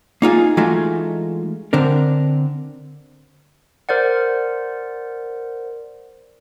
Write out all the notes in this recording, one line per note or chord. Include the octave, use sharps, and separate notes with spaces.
A#3 D#4 F4 G#4
E3 G#3 A3 D#4 F4 F#4
D3 C4 D4 A#4
A#4 C5 D5 F#5